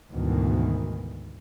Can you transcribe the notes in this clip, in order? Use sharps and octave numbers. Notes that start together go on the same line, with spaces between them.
D2 G#2 B2 D#3 E3